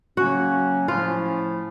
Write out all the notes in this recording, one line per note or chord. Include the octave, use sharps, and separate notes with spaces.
C#3 F#3 A#3 C#4 F#4
A2 F3 A3 C#4 E4 F4